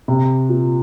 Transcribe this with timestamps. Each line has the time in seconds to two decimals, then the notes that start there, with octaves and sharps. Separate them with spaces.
0.08 C3
0.49 A#2